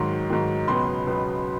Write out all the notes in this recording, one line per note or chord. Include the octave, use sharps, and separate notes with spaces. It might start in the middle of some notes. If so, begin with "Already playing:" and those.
Already playing: G#2 D#3 F#3 C6
G#2 D#3 F#3
C#2 B2 F#3 B3 C6
C#2 B2 F#3 B3